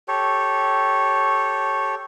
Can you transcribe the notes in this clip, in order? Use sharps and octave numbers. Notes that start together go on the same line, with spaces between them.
G4 A4 C#5